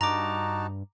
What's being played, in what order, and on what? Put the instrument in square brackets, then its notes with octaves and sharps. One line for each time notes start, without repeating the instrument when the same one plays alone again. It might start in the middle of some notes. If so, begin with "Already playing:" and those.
[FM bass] G2 [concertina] D#4 F#4 A5 [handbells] A#5 D6